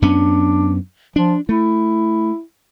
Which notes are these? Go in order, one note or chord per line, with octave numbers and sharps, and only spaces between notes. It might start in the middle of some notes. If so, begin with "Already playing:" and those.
F#2 B3 C#4 D4
F3 D4
A3 E4